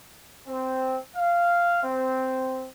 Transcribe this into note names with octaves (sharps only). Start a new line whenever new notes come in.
C4
F5
C4